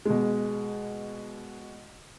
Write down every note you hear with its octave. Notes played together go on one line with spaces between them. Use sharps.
B2 G#3